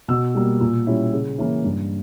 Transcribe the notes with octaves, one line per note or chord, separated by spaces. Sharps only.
B2 E6
G3 A#3
A#2
G3 C#4 E4
C#3
E3 A#3 C#4 E4
G2